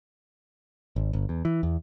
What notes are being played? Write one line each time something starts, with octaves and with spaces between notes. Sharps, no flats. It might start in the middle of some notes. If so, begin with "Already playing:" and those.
G#1
G1
E2
E3
E2